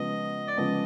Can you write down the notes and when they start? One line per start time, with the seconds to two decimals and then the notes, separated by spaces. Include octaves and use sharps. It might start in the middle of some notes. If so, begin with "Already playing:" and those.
Already playing: C#3 F3 G#3 B3 D#5
0.48 D5
0.58 C#3 F3 G#3 B3 D#5